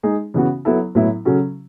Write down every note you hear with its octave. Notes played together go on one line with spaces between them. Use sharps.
G#3 D#4 G#4
C#3 E3 B3 F#4
F#3 B3 E4 A4
A2 F#3 B3 E4
C#3 F#3 C#4 F#4 A4